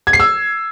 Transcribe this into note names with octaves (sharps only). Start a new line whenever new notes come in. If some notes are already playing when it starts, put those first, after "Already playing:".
G#6
C7
E6